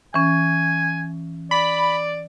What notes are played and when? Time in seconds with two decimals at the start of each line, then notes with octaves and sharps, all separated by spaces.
0.14 E3 C#4 G#5
1.51 D5 B5